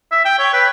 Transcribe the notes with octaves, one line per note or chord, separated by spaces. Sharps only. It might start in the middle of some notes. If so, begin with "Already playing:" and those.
E5
G5
C#5
B4